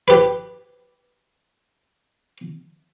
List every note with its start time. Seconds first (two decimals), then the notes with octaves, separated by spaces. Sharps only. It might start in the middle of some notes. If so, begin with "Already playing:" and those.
0.08 G4 B4